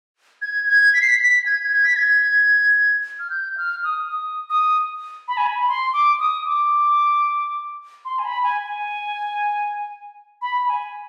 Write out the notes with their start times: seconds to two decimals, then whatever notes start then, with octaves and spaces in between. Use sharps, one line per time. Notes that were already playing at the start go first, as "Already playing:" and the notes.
0.42 G#6
0.67 G#6
0.94 B6
1.01 C7
1.08 B6
1.21 B6
1.46 G#6
1.73 G#6
1.84 B6
1.96 G#6
3.19 F6
3.30 G6
3.57 F6
3.84 D#6
4.09 D#6
4.50 D#6
5.28 B5
5.37 G#5
5.47 B5
5.68 C6
5.93 D6
6.20 D#6
6.47 D6
8.05 C6
8.19 G#5
8.25 B5
8.43 G#5
8.63 G#5
10.42 B5
10.62 B5
10.68 G#5